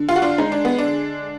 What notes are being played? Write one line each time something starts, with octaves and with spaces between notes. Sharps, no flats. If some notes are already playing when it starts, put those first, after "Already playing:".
Already playing: D3
F4
F#4
D4 F4
G#3 D#4
D4
B3
D4
D3